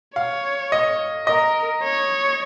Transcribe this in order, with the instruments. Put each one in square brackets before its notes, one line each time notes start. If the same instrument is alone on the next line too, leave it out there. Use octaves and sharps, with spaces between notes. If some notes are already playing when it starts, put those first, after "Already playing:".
[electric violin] C#5 [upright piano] F5
[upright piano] D#5
[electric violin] A#4 [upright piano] D#5
[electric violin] C#5